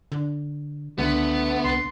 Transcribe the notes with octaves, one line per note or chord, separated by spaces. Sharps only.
D3
C#2 D3 A3 B3
C2 C6